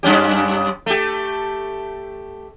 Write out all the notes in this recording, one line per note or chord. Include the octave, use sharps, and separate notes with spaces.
F#2 C#4 G4
A3 G4